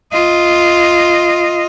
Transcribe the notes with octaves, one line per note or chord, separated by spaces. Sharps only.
F4 D#5